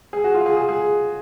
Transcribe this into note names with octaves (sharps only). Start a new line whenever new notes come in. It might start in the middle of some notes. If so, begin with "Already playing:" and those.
G#4
F#4
F4
G#4
G#4
G#4